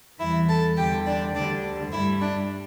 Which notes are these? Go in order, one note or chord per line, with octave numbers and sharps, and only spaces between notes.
E2 E3 G3 E4 E5
A4 A5
E2 D3 G3 G4 G5
D4 D5
D2 D3 G3 D4 D5
G2 G3 E4 E5
D4